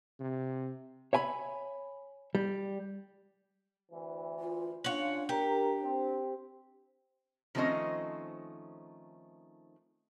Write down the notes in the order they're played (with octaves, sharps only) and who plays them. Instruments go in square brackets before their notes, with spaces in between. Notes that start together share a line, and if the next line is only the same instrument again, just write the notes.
[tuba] C3
[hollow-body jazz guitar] C#5 E5 G#5 B5
G3
[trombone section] D2 E3
[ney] F4
[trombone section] C#4 F4 [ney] D4 [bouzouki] C#5 F#5
[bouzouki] G4 [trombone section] A#4
[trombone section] C4
[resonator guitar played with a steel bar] D#3 F3 A3 C4 C#4 D#5